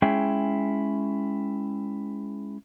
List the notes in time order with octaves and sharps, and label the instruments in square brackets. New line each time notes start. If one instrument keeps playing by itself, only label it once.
[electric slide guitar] G#3 C#4 E4 G#4 G5